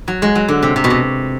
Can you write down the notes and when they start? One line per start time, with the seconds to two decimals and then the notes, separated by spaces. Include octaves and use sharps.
0.08 F#3
0.22 G#3
0.35 F#3
0.48 D3
0.62 C3
0.76 C3
0.84 B2
0.90 C3